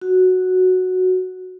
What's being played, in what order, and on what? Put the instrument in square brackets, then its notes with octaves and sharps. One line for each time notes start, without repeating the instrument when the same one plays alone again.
[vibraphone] F#4